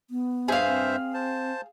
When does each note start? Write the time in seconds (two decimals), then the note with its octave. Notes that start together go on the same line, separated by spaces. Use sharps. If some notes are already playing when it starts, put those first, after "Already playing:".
0.10 B3
0.48 G2 G#4 C5 E5 F5
0.67 C4
1.14 C5 A5